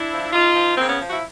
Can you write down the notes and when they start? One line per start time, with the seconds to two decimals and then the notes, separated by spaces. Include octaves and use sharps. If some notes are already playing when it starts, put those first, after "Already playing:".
Already playing: D4 E4
0.11 F3
0.33 C#3 D#4 F4
0.55 F3
0.77 C#3 A#3 C4
0.88 B3 C#4
1.00 F3
1.10 E4 F#4